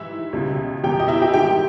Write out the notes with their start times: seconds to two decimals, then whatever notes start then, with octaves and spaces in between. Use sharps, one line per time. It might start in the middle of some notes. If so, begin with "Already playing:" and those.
Already playing: G#2 E3 G3 E4 E5
0.33 C#2 B2 G3
0.83 E2 B2 G3 G4 G5
1.00 D#5
1.08 E4 E5
1.22 G4 G5
1.34 G#2 D#3 G3 G4 G5